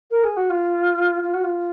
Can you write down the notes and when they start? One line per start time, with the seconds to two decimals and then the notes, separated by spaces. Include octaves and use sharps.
0.11 A#4
0.23 G#4
0.36 F#4
0.49 F4
1.23 F4
1.33 F#4
1.43 F4